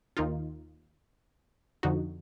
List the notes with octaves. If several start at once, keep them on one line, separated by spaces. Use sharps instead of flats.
D#2 D#3 A#3 D#4 F4
F2 D3 F3 D#4 F#4